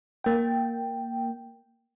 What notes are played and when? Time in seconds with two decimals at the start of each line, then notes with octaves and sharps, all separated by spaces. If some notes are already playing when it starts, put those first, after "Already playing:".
0.24 A#3 G5